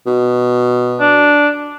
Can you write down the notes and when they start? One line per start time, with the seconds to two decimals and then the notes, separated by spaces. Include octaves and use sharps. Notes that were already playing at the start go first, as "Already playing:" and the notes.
0.07 B2
1.00 D4